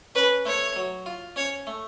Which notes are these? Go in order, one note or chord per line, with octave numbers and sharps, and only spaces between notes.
C#4 B4
A3 C#5
F#3
F4
C#4 C#5
A3